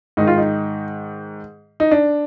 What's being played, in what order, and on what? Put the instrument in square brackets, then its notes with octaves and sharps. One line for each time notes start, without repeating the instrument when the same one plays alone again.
[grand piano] G#2 D#3 D#4
F4
D#4
D#4
D4